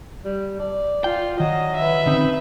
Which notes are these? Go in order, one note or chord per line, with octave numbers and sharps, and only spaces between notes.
G3
D5
F4 G5
D#3 F#3 D#5
B4 E5
D3 C4 C#4 D#4